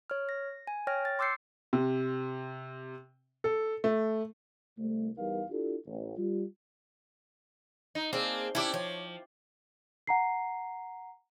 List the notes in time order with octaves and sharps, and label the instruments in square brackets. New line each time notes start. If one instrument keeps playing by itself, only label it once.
[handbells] C#5 F6
A#6
G#5
C#5 G5 F6 A#6
A6
C6 D6 E6 G6 C7 C#7
[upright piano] C3
A4
A3
[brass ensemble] C2 A3
E2 G3 D#4 A#4 F5
D4 E4 F4 G4 A4
A1
G3 F4
[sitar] D#4
[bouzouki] A#3 D4 G#4 [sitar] C4
[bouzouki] C#4 D4 [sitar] E4 G4
[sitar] F3 [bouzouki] C#5
[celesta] F#5 A#5 C7